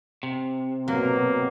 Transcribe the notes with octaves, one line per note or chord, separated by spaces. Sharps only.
C3
B2 F#3 A#3